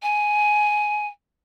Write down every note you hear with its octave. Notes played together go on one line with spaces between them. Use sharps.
G#5